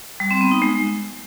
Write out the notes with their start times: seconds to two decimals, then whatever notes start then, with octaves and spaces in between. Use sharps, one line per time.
0.20 G3
0.31 C4
0.41 B3
0.51 D#4
0.62 G#3